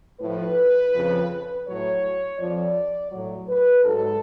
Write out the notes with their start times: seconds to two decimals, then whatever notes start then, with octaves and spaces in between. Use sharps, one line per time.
0.21 A2 F3 B4
0.94 F2 C#3 F3
1.66 A2 F#3 C#5
2.39 F2 F3 D5
3.12 A2 F#3
3.48 B4
3.84 G#2 F#3 A4